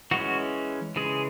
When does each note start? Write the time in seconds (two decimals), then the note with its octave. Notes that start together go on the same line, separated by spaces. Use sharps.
0.11 E3 G#3 C#4 F#4
0.96 C#3 E3 G#3 G#4